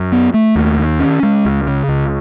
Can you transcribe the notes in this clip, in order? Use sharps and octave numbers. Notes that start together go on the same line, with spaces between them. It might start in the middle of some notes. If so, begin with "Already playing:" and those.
Already playing: F#2
B3
A3
D#2
D#3
C#4
G#3
C#2
C#3
C#2